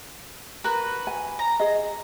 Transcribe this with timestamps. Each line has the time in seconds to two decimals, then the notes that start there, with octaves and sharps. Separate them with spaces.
0.64 F#4 A#4 B4
1.07 G#5
1.39 A#5
1.60 G#4 D#5